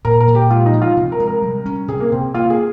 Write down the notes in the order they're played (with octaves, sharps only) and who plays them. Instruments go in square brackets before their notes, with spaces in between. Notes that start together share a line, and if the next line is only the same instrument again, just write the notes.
[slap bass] A#2 [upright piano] A#4
[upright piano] A#4
[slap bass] A#2
[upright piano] G4
[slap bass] G#3 [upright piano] F4
[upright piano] D#4
[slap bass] F3
[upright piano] F4
[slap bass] C3
[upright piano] A#4
[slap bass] G#3
[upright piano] A#4
[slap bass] G3
C#4
[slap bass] C3 [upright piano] G#4
[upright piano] A#3
[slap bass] C3 [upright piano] C4
[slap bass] A#3 [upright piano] F4
[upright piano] G#4